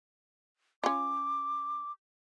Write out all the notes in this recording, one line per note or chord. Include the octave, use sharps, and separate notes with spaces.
C#4 F4 D6